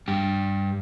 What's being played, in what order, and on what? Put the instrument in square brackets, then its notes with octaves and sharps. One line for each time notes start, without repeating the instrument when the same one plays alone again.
[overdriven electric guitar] G2 G4